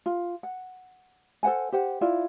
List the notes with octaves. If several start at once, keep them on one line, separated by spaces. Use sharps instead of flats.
F4
F#5
A4 C5 F#5 G#5
G4 C5 F#5
E4 F4 D5